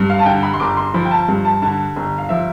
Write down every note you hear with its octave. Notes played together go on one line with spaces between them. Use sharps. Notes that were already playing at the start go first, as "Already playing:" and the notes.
Already playing: G2
F5
A5
D3 G5
B5
C6
G1 D6
C6
F3 B5
G5
A5
G2
A5
D3 A5
G1
F5
F3 E5